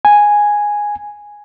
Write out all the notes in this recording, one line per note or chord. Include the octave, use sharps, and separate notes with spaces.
G#5